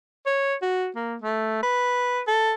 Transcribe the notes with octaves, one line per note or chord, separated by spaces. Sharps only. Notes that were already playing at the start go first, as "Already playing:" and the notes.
C#5
F#4
A#3
A3
B4
A4